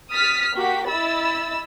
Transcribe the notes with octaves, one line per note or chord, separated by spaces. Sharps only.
D#6 F6 A6 B6
A#3 F#4 G4 B6
E4 D#5 B5 E6 A6